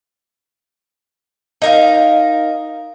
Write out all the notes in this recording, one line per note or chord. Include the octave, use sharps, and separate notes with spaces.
D#4 A#4 F5